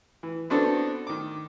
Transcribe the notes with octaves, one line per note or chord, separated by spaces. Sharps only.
E3
B3 C4 D4 F#4 A4
D#3 D6